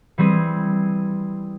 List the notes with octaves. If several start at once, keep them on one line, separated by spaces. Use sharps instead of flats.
E3 G3 C4 G#4